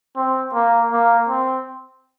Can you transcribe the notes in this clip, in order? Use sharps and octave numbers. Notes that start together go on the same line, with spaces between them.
C4
A#3
A#3
C4